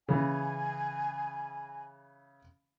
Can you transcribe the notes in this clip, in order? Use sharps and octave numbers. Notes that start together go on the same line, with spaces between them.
C#3 E3 G#5